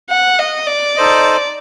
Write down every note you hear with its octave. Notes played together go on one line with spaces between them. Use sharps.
F#5
D#5
D5
D#4 A4 C5 D#5